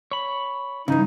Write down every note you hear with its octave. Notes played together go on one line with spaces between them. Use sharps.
C#5 B5
G2 C#3 E3 D#4